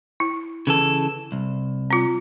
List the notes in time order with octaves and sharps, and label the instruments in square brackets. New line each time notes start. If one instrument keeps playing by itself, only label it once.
[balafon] E4
[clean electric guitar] C#3 E3 A4
C2
[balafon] C4 F4